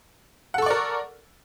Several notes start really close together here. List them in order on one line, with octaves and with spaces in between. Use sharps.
F#5 A4 C#6 D5 A#4